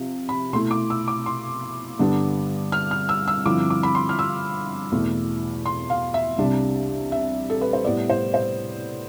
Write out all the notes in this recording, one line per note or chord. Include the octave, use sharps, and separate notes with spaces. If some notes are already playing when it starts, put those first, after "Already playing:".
Already playing: C3 F3
B5
B2 A3 E4 C6
D6
E6
D6
C6
G2 D3 G3 B3 D4
F6
F6
E6
E6
G2 D3 F3 C4 E4 D6
D6
B5
C6
F6
E6
E2 B2 A3 E4
C6
F5
E5
C2 C3 G3 D4
E5
A4
B4
C5
A2 G3 B3 E4 D5
C5
C5